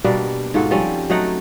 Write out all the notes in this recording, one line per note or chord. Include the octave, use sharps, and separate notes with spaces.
B2 G3 A#3 D4
G#2 F4 F#4 A4
F3 G3 C4 C#4
F#3 A3 D#4 F#5